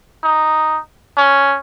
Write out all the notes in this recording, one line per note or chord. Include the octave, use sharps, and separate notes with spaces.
D#4
C#4